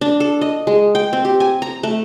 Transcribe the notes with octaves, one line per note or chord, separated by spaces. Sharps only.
D4
A4
D#5
G#3
G5
C4
G4
G#5
A#5
A3